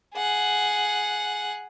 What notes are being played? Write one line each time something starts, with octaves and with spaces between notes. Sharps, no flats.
G#4 F#5